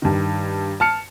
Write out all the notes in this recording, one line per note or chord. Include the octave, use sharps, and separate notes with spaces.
G2 D#3
A5 F6 C#7